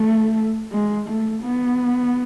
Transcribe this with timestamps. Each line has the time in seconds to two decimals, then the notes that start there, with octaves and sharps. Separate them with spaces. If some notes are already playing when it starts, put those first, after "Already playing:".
Already playing: A3
0.72 G#3
1.08 A3
1.43 B3